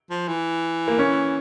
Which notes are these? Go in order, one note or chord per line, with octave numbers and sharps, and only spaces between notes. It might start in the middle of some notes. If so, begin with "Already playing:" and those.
F3
E3
A#3
C#4